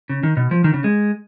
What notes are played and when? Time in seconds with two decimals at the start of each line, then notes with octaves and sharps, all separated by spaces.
0.09 C#3
0.23 D#3
0.37 B2
0.51 F3
0.64 D#3
0.74 C#3
0.84 G#3